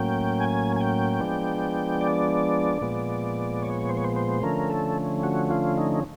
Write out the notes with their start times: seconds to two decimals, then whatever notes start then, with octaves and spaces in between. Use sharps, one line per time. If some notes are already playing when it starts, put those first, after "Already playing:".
Already playing: A2 F#3 A#3 C#4 G5
0.40 G#5
0.76 G#5
0.81 G5
1.21 F3 G#3 B3 D4
2.01 D5
2.81 A#2 F3 G#3 B3
3.62 C#5
3.89 C5
3.97 C#5
4.04 C5
4.16 C5
4.43 D3 F3 A3 C#4 A#4
4.70 A4
5.23 F#4
5.50 F4
5.77 D#4